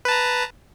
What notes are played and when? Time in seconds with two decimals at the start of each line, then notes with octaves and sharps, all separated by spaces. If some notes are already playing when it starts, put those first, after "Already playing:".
0.05 B4
0.08 A5
0.12 A#5